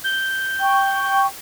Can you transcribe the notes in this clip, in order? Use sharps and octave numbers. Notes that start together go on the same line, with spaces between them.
G6
G5 C#6